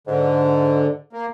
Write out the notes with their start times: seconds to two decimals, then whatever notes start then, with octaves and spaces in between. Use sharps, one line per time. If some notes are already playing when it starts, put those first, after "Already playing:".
0.07 G#2 D3
1.13 A#3